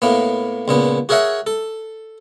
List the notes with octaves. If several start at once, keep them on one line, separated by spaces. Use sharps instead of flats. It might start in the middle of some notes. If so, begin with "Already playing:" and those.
A2 A#3 B3
C#2 A#2 B3
F#4 G#4 A#4 C#5 E5 F#5
A4